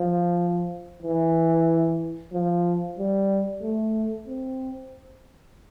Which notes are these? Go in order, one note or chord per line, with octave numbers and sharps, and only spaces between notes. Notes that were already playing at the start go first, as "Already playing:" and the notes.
Already playing: F3
E3
F3
G3
A3
C4